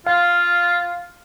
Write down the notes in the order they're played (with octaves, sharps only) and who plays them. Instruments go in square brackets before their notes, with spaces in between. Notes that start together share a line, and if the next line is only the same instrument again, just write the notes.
[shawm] F4 [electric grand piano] F5